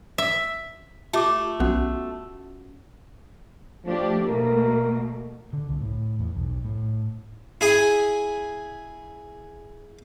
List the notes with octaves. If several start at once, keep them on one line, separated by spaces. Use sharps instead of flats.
E5
A3 F4 G4 D6
B1 B3 C#4 F#4 F#5
F3 A3 D4 G4
B2 A3 A#3 A#4
D3
C2
A2
E2
B1
A2
E4 G#4 G#5